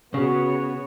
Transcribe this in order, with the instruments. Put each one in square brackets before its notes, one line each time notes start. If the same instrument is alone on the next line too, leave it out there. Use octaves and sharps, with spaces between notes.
[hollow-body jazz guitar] C#3 [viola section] B3 F#4 C#5